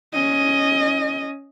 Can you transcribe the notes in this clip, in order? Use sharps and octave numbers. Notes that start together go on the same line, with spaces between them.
C#4 D#5